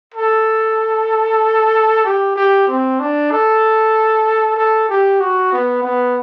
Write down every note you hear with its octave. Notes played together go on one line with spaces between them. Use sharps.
A4
G4
G4
C4
D4
A4
A4
G4
F#4
B3
B3